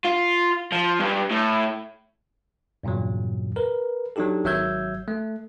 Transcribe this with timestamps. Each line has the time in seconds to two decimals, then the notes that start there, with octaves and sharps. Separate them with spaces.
0.05 F4
0.72 F3
1.00 G2
1.31 A2
2.83 E2 G2 A#2 C#3 F#3
3.56 A#4 B4
4.16 F#3 D4 D#4 G4 A4
4.45 G#1 F#3 E5 E6 G6 G#6
5.08 A3